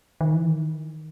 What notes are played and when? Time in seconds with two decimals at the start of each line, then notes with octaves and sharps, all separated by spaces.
0.21 D#3
0.34 E3
0.49 D#3